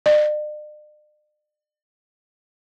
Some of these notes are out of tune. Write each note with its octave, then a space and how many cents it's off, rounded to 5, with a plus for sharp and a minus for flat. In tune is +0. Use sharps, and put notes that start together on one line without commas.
D5 +45